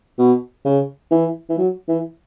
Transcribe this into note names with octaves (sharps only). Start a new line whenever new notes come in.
B2
C#3
E3
E3
F#3
E3